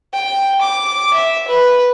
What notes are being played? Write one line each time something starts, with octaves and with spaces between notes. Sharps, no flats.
G5
D6
E5
B4